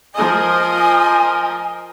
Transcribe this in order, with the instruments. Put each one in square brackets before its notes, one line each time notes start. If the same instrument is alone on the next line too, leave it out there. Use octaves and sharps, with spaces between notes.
[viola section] F3 A#4 D#5 [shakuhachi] G#5